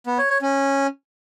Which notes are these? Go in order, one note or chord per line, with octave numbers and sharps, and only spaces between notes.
B3
C#5
C#5
C#4